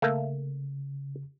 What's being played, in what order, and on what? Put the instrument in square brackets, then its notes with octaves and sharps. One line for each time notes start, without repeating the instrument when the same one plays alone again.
[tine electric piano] C#3 [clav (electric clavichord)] A3 A#3